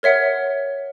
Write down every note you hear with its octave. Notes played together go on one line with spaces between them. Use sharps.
A#4 C#5 E5 F#5